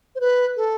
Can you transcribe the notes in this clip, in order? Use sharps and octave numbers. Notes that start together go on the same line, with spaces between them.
C5
B4
A4